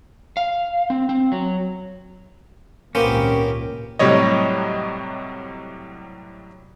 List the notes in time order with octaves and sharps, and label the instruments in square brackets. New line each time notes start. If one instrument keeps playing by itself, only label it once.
[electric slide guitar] F5
C4
C4
F#3
[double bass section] G#1 C#2 A#2 [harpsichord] A#3 B3 C5 [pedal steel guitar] C#4 G4
[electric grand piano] A2 C3 F#3 G3 C#5 D#5